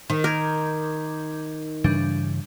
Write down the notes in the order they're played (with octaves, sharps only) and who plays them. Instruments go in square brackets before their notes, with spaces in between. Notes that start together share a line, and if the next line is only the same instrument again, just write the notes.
[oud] D#3
[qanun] A#4 [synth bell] D6 G6 G#6
[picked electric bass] G2 C#3 E3 [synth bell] G3 D4